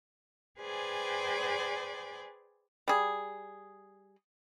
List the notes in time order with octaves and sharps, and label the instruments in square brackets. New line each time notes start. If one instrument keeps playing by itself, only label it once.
[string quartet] G#4 B4 C5 D5 G5 G#5
[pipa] G3 G#4